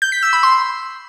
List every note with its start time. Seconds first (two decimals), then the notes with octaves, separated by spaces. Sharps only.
0.02 G6
0.12 B6
0.22 E6
0.33 B5
0.43 C6